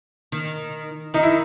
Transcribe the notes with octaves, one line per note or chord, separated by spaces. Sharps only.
D#3
D#3 D#4
E4